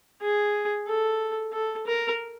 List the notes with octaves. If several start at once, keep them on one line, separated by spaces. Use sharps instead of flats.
G#4
A4
A4
A#4